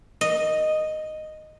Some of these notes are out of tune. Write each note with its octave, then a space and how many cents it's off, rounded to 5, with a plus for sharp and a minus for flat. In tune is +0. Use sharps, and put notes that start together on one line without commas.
D#5 -5